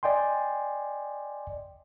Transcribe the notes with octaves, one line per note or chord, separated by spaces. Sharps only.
D5 D#5 G5 G#5 C6